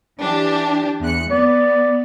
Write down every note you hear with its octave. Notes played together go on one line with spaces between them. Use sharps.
E3 D4 G4
E2 F#6 C#7
B3 D5